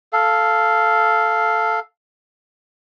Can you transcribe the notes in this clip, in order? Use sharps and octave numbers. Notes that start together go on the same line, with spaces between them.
A4 F5